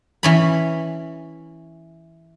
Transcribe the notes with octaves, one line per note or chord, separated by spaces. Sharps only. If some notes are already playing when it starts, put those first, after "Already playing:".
E3 C#4 B5